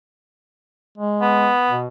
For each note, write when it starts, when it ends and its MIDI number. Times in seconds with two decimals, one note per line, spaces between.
0.98 1.51 56
1.22 1.78 59
1.69 1.87 47